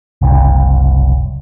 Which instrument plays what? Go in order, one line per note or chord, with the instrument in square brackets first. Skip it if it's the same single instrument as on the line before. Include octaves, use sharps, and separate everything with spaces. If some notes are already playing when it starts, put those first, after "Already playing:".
[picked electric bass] F#1 C2